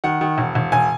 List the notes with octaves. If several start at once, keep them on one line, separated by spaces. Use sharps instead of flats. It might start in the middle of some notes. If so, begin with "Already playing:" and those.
D#3 F#5
D#3
E1
E1
E1 G#5